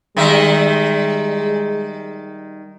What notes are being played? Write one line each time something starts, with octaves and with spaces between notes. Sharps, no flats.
D#3 G3 G#3 E5